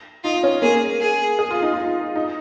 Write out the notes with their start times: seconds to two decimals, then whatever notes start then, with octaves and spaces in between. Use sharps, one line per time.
0.24 D#4 F4
0.44 C#4
0.62 A#3 G#4
1.01 G#4
1.39 G#4
1.51 F4
1.62 D#4
1.74 F4
2.16 D#4